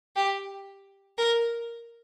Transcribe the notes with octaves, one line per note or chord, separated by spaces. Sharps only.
G4
A#4